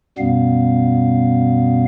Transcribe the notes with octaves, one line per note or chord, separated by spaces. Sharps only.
F#2 B2 G3 B3 F5